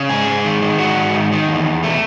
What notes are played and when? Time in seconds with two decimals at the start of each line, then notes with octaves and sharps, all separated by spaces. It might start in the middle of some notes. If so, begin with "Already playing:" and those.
Already playing: C#3
0.09 G#2 G#4
0.28 G#2
0.45 D#3
0.62 D#3
0.79 G#2 F#4
0.97 G#2
1.14 D#3
1.32 D#3
1.48 E2
1.66 E2
1.83 B2 A3